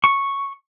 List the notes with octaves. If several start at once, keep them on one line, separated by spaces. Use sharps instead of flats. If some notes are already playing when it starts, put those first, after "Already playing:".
C#6